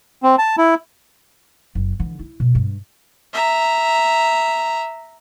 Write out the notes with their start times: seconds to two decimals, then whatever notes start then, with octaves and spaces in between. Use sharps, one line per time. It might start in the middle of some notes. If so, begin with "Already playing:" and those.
0.23 C4
0.38 A5
0.57 E4
1.75 F#1
2.00 D3 E3
2.19 E4
2.40 B2
2.55 G2
3.33 E5 A#5